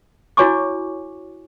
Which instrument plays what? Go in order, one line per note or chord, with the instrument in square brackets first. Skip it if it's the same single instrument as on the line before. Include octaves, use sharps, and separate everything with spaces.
[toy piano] E4 F#4 C#5 G#5 C#6 D6